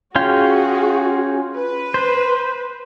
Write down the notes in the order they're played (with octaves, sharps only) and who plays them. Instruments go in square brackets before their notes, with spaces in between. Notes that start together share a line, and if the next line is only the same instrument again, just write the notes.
[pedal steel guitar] C#4 F4 G5 [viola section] F#4 G#4
[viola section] B4
[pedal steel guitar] C5